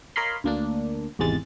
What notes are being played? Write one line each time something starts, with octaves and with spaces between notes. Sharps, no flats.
A#4 C#5 D#5 F5 B5 C6
D2 A#3 D4
G#1 E2 C3 G#3 A6